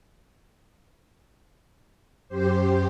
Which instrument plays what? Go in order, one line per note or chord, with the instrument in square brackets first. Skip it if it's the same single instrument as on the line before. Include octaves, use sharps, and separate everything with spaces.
[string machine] F#2 G4 C5